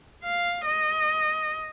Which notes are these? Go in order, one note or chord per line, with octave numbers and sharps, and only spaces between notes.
F5
D#5